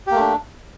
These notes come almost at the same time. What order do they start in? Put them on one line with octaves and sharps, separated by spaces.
G4 A#3 A3 D4